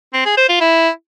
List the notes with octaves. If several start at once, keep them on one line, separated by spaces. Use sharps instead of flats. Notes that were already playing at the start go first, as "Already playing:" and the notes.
C4
G#4
C5
F4
E4